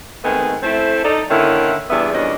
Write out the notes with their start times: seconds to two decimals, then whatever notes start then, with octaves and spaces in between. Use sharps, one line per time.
0.24 D#3 G#3 A3 B3 C4 D#4
0.63 A3 C4 E4
1.04 D#4 A4 D5
1.30 D3 D#3 A#3 C#4 E4
1.90 E2 G2 B3 G#4 D5 E5
2.13 E2 A#2 G3 C#4 D4 D#5